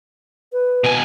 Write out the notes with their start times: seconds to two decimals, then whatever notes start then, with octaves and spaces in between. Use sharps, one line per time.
0.53 B4
0.84 B2 G#5